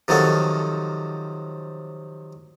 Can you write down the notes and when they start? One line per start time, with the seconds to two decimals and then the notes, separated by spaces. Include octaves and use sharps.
0.08 C3 D#3 F3 F#3 A4